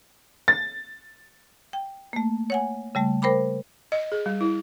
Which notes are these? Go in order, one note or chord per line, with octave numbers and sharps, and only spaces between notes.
A6
G5
A3 A#3
C#5 F#5 G#5
C#3 G3 A3
A#4 C5 G5 B5 D6
D#5
G#4
G3
E4